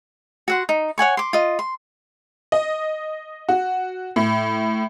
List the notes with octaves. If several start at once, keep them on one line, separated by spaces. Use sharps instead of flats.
F#4 F#5 C6
D#4
C#5 F#5 G#5 C#6
C6 D6
F4 D#5
C6
D#5
F#4
A2